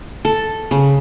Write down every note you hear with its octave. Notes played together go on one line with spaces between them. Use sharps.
A4
C#3